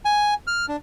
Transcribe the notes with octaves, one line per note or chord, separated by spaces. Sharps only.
G#5
F6
D4